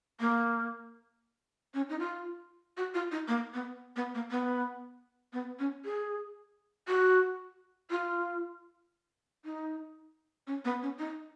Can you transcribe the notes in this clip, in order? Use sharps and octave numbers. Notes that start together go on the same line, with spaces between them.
A#3
C#4
D#4
F4
F#4
F4
D#4
A#3
B3
B3
A#3
B3
B3
C#4
G#4
F#4
F4
D#4
C#4
B3
C#4
D#4